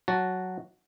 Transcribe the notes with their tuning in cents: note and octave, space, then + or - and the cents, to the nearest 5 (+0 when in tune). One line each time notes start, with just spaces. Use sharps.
F#3 +0 F#4 +0 A5 -5